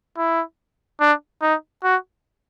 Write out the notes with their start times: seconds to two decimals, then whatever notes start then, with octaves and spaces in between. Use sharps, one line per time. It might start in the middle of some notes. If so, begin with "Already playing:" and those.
0.17 E4
1.00 D4
1.42 D#4
1.83 F#4